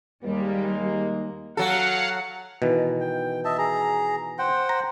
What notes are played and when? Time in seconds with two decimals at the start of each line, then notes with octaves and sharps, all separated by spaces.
0.24 D#2 G3 G#3 A#3
1.57 F#3 A4 F5 F#5
2.62 B2 D#3 E3
3.00 G5
3.45 D#5 E5 A5
3.58 G#4 A#5
4.39 C5 F#5 G5
4.69 A#5